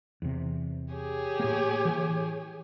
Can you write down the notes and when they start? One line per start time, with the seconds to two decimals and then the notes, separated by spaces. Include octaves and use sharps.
0.22 E2 C3
0.93 G4 G#4 C#5
1.40 A2 A#3
1.85 E3